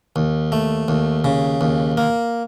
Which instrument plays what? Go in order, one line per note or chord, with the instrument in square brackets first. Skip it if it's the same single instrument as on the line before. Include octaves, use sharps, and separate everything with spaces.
[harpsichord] D#2
A3
D#2
C#3
D#2
A#3